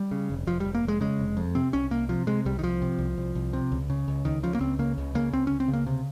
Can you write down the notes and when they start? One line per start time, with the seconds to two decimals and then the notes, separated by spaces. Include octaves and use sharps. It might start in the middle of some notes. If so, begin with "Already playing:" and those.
Already playing: G3
0.11 C#3
0.30 F1
0.47 F1 F3
0.60 G3
0.65 F1
0.75 A#3
0.83 F1
0.88 G#3
1.01 C#3 G#3
1.19 F1
1.37 F2
1.55 C3 C4
1.73 C2 C#4
1.90 C2 A#3
2.09 C3 F3
2.27 C3 G#3
2.45 C2 G3
2.59 D#3
2.63 C2 F3
2.82 C3
2.99 C2
3.18 C2
3.35 C2
3.53 C3
3.72 C#2
3.90 C#3
4.08 C#2
4.25 C#2 D#3
4.43 C#3 F3
4.55 A#3
4.60 C#2 C4
4.79 C#3 A#3
4.97 C#2
5.15 C#3 A#3
5.32 C#2 C4
5.47 C#2 C#4
5.60 C4
5.68 C#3
5.73 A#3
5.87 C3